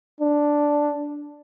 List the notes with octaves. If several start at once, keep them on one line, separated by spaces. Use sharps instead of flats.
D4